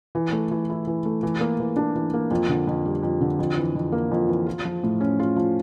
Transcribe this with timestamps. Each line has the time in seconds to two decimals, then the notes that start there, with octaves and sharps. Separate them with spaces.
0.15 E3
0.32 A3
0.51 E3
0.70 E4
0.87 E3
1.05 A3
1.23 E3
1.40 A#3
1.60 E3
1.76 D4
1.96 E3
2.14 A#3
2.31 F2
2.49 D3
2.67 F2
2.85 G3
3.03 F2
3.21 D3
3.39 F2
3.57 E3
3.75 F2
3.92 A#3
4.11 F2
4.28 E3
4.46 F4
4.65 F3
4.83 A2
5.00 C#4
5.19 F4
5.36 F3